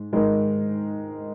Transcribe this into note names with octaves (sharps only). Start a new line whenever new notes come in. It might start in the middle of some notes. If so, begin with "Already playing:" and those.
Already playing: G#2 G#3
G#2 D#3 G#3 D#4 A#4